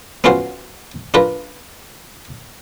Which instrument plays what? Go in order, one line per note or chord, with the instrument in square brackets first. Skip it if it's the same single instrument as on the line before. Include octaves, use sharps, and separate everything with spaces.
[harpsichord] B3 C#4 F4 F#4 C5
D4 F4 A#4 B4